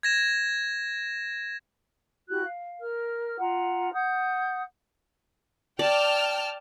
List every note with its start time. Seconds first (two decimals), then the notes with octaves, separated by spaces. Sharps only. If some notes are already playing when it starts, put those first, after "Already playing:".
0.03 G#6 A#6 E7
2.28 E4 F#4 G4 F#6
2.44 F5
2.80 A#4 F6
3.38 F4 F#5 A#5
3.92 F#5 D#6 G6
5.79 D5 G5 A5 F6